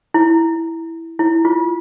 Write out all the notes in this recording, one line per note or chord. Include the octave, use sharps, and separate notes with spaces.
E4
E4
F4